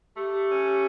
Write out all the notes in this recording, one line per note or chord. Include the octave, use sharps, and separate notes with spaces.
A3 G4
C#4